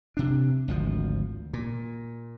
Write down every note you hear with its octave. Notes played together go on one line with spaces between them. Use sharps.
C3 D4
G#1 D2 F3
A#2